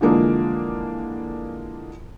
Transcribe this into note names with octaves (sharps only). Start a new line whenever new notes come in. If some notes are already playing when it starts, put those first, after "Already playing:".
D3 E3 F3 G#3 A#3 D4